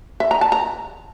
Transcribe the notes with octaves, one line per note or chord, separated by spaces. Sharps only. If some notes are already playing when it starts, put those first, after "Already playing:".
E5
A#5
A5
A#5